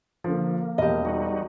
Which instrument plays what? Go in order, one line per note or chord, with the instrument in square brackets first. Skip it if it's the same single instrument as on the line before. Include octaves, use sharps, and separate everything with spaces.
[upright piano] D3 F3 [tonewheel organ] A#3
[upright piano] E1 [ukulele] G4 D#5
[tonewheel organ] G3 D#4 F#4